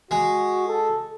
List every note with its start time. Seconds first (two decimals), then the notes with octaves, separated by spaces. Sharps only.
0.11 G#3 F#4
0.68 A4